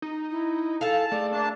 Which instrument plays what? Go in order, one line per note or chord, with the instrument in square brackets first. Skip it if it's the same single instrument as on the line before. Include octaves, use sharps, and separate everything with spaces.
[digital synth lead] D#4
[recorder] E4
[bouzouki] G#4 F5 [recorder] A4 [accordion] A5
[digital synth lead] A3 [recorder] D5
[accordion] A#3 D4 A5